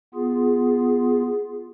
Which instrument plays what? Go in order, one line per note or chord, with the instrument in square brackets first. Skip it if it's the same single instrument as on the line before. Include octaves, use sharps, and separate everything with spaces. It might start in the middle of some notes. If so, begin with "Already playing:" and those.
[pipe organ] B3 F4 G#4